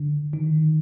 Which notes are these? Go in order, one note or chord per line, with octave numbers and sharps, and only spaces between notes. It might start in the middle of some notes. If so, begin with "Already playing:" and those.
Already playing: D3
D#3